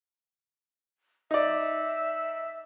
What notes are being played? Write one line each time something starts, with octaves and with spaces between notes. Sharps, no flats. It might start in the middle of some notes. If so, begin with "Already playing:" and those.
D#4 D5 E5